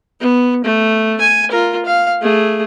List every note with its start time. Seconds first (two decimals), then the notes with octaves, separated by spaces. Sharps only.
0.21 B3
0.64 A3
1.20 G#5
1.51 F4 A#4
1.86 F5
2.22 A3 G#4